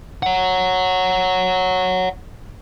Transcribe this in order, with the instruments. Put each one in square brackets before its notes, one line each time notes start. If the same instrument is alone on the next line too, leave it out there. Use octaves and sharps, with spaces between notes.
[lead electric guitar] C#5 F#5